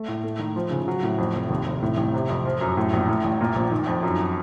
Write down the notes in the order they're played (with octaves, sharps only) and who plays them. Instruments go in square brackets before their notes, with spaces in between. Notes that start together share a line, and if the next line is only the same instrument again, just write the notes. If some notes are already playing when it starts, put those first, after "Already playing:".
Already playing: [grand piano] A3
A2
A3
D#3
F3
C#3
F#3
A2
F2
F1
D#2
F1
A2
A1
C3
F2
F3
F#2
A2
A#1
A2
A1
A#2
A#1
D#3
F2
F#2